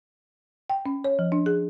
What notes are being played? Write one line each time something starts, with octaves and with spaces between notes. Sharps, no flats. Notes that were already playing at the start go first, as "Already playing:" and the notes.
G5
C#4
C#5
F3
D4
G#4